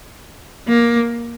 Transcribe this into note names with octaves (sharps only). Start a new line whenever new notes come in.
A#3